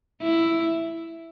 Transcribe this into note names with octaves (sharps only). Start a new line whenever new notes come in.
E4